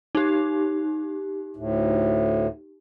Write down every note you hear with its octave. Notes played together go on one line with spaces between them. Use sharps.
D#4 G4
D2 A2